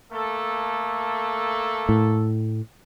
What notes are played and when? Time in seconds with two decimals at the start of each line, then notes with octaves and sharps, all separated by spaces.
0.12 A3 A#3 A4
1.89 A2